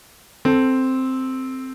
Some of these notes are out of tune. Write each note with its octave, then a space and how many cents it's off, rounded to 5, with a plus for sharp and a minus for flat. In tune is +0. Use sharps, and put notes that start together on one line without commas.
C4 +0 A4 +0